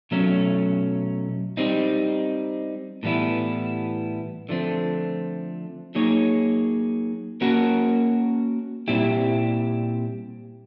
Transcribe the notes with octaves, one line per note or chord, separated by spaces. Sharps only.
B2 F#3 A3 C#4
G3 C4 D#4
A2 E3 G3 B3 E4
D3 F3 A3 C4
F#3 A#3 D#4 G#4 C#5
A#3 C#4 F#4 A#4
A#2 G3 C4 E4 G4